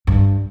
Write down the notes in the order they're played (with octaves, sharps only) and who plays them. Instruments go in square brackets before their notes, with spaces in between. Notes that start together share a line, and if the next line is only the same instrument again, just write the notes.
[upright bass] G2